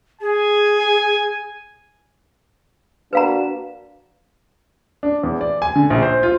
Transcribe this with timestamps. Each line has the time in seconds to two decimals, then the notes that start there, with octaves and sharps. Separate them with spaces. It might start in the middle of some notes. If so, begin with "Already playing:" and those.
0.21 G#4 G#5
3.13 A#3 D4 F#4 B4 F5 A#5
5.03 D4
5.23 E2
5.41 D5
5.62 G#5
5.76 D3
5.90 A#1
6.02 C5
6.23 F4